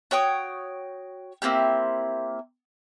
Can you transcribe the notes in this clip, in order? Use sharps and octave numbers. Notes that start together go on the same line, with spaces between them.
F#4 C#5 G5 D#6
A#3 C4 E4 G4